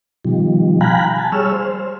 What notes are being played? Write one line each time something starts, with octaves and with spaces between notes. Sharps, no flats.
B2 D#3 F3 G3
F5 G5 G#5 A#5 B5 F#6
G#5 A5
G3 G#4 C#5 E6 F6
C5